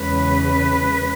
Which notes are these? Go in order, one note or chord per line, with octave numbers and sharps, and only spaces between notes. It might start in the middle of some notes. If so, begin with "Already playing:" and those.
Already playing: E2 C#3 G#3 B4